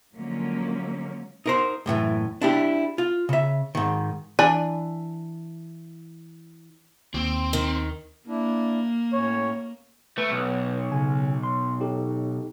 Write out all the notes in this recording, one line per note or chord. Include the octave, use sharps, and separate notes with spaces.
D3 F3 F#3 G#3 A#3 C#4
D#4 A#4 C5
F#2 A2 D3 E3
D4 E4 G4
F4
C#3 E5
G#2 D#3
E3 D4 G#5
D#2 C4
D#3
A#3 D4 E4
A2 C#4 C#5
A3 B4
B1
C#3 G#5
C6
D#4 G4 A4